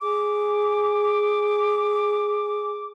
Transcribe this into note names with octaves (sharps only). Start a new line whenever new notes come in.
G#4 D6